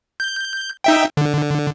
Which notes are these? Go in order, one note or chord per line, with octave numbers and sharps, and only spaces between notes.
G6
D#4 E5 G5
D3